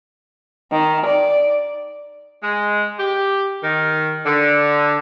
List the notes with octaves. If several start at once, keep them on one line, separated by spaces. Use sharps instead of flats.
D#3
D5
G#3
G4
D#3
D3